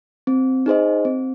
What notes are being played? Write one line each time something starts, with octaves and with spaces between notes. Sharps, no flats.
C4
D#4 G#4 C5 D#5
C4